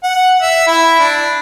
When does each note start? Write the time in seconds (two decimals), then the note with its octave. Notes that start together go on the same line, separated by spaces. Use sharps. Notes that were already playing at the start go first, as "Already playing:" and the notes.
0.03 F#5
0.42 E5
0.67 E4
0.99 D4